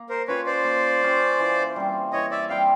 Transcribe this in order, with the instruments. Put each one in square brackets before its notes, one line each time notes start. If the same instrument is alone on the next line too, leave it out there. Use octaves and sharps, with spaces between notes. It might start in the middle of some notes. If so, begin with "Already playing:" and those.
Already playing: [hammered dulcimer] A#3
[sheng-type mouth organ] A#4 C5
[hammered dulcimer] C#4 F4 [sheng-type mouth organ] B4 C#5
[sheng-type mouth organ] C5 D5
[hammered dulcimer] A#3
C#4 F4
E3
G3 C4
[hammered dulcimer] E3 [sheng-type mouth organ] C#5 D#5
[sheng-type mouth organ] D5 E5
[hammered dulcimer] G3 C4 [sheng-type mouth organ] F5 G5